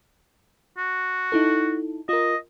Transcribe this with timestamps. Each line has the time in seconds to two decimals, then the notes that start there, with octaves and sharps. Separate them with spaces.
0.78 F#4
1.32 D#4 E4 A4
2.09 F4 A#4 D#5